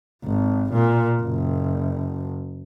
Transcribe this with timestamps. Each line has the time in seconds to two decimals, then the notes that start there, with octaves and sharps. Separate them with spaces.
0.24 G#1
0.72 A#2
1.21 F#1